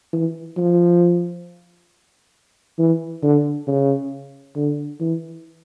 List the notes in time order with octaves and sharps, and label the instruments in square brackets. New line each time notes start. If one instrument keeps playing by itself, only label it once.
[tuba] E3
F3
E3
D3
C#3
D3
E3